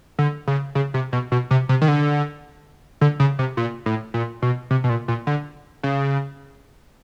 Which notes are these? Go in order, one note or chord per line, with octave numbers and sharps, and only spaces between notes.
D3
C#3
C#3
C3
B2
B2
C3
C3
D#3
D3
D3
C#3
C3
A#2
A2
A#2
B2
C3
B2
A#2
A#2
D3
C#3